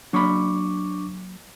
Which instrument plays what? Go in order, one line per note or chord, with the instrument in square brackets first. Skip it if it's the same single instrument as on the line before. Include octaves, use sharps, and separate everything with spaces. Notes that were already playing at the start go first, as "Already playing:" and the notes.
[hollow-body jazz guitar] F#3 A#3 B5 [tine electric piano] D4 C#6 D6